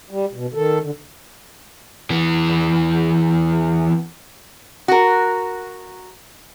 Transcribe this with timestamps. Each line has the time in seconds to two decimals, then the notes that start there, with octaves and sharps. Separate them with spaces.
0.10 G3
0.34 B2
0.54 D#3 A4
0.82 D3
2.10 E3 B3
4.88 F#4 A#4